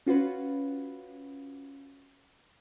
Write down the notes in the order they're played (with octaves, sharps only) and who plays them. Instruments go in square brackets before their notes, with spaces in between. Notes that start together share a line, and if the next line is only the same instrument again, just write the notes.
[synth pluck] C#4 F4 F#4 B4